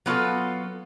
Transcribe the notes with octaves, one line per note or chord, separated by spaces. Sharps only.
F#3 B3 F4 A4